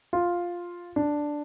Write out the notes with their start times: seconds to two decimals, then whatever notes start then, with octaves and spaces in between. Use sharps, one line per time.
0.13 F4
0.96 D4